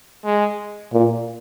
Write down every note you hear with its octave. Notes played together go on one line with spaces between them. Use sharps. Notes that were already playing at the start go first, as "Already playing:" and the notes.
G#3
A#2